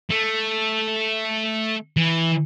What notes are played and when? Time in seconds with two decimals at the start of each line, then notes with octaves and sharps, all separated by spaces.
0.10 A3
1.97 E3